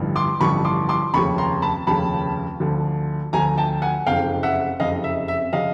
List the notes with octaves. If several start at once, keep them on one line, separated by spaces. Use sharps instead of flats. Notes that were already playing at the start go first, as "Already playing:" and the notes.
Already playing: A1 G2 D3 F3
C6 D6
A1 G2 D3 F3 B5 C#6
C6 D6
C6 D6
F1 D#2 C#3 F3 B5 C#6
A#5 C6
A5 B5
F1 D#2 C#3 F3 A5 B5
D2 D3 F3
D2 D3 F3 G#5 A#5
G5 A5
F#5 G#5
F#1 F2 C3 F5 G5
E5 F#5
F#1 F2 C3 D#5 F5
E5
E5
C#3 F3 D#5 F5